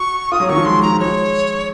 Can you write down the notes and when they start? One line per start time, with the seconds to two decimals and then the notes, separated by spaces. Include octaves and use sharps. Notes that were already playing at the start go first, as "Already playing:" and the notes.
Already playing: F#4 C#6
0.32 F4 D#6
0.40 F#3
0.49 D#3 C#6
0.57 F3
0.65 G#3 C6
0.82 F3 A#5
1.00 G#3 C#5